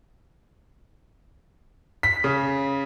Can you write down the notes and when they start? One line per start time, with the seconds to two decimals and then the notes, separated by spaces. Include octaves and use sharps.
2.03 B6
2.24 C#3